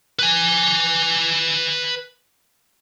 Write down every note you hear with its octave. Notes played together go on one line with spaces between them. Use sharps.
B4 G#5